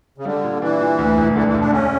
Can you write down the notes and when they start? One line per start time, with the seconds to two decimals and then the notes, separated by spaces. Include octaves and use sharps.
0.18 C#3
0.25 D3 G3
0.44 A#2
0.62 E3 D4
0.81 A#2
0.98 D2
1.17 E1
1.36 D3 E3
1.48 E3
1.54 E1
1.60 D4
1.72 D3 C#4